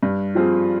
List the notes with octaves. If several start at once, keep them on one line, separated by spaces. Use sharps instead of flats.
G2
F3 C4 F4 G#4